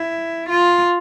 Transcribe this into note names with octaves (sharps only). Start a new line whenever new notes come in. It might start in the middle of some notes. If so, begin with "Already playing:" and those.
Already playing: E4
F4